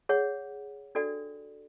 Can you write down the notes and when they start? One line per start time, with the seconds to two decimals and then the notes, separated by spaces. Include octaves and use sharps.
0.09 G#4 C#5 F#5
0.95 D4 F#4 A4 D5 G5